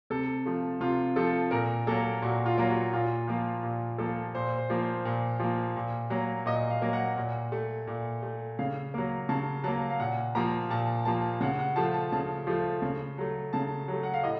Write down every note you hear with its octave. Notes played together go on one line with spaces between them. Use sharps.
C3 A4
F3 A3
C3 F4
F3 A3 A4
A#2 A#4
F#3 A#3 A4
A#2 F#4
F4
F#3 A#3
F#4
A#2 F4
F3 A#3 F4
A#2
F3 A#3 A4
A#2 C5
C5
F3 A#3
C5
A#2
F3 A#3
A#2
F#3 A#3
A#2 D#5
F5
F#3 A#3
F#5
A#2
A3
A#2
A3
C#3 F5
F#3 A#3
C#3 A5
F#3 A#3 A5
F5
A#2 F#5
F3 A#3 A#5
A#2 A5
F3 A#3 A5
C#3 F#5
F#5
F3 A3 A5
A5
C#3 A5
F3 A3
C#3
F#3 A3
C#3 A5
F#3 A3
F#5
F5
A2 D#5